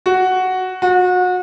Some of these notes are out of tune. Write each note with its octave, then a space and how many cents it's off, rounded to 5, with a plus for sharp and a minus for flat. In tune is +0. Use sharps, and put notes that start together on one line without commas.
F#4 +5
F#4 -30